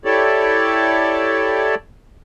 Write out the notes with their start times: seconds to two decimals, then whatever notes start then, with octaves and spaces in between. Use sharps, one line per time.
0.05 E4 G4 A4 C#5 D5